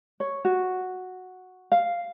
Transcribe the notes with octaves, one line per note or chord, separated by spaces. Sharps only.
C#5
F#4
F5